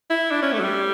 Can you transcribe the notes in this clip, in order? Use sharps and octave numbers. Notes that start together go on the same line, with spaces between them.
E4
D4
C#4
A3
F#3
G3